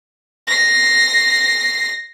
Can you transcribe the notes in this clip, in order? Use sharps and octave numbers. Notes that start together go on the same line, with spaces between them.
A#6 C7